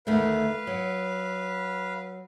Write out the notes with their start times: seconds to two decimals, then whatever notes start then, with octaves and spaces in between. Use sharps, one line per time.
0.07 D2 D#3 A3 B4 F5
0.67 F#3